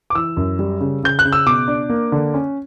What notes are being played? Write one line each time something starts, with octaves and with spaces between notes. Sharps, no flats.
D6
E3 E6
F#2
G3
C#3
C#3 G6
F#6
C#3
E6
B2 D6
D4
A#3
D3
C#4